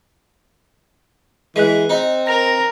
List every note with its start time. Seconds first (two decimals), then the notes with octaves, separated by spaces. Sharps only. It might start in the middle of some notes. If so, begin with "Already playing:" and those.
1.56 E3 G#3 F#6 D#7
1.89 C4 D#4
2.27 A#4 A#6 F7